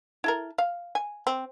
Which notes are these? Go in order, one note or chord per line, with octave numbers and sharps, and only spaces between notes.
E4 A4 A#4
F5
G#5
C4